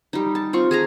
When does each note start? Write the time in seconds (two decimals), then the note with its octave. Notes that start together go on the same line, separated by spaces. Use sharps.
0.13 G3 D#4
0.35 A5
0.53 C4 F4 C#6
0.71 G#4 A5 A#5